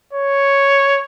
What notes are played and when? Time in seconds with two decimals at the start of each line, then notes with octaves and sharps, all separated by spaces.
0.13 C#5